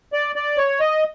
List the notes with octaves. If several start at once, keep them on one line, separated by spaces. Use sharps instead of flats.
D5
D5
C#5
D#5